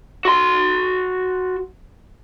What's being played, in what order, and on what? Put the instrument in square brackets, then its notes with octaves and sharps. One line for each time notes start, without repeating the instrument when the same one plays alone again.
[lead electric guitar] F#4 C6